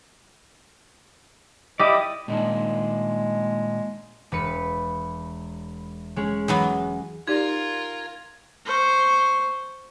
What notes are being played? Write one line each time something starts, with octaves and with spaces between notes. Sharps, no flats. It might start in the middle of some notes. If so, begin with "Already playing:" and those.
E4 G4 D5 D#5
A#2 D#3 G#3 D4
E1 B4 C#7
G#3 C#4 G#4
E3 F#3 B3
D#4 F4 G4 A#4 D5 G#6
C5 C#6